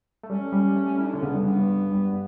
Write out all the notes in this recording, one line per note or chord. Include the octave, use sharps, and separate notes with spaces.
A3
G3 C#4
G3
A3
E4
D4
D3 C#4
C#3 B3
G2
G2 B3
G2
G2